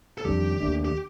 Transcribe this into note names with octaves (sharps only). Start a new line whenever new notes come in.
A4
F2 D#3 G3 D4 G4
D#2 D#3 A3 D4
G4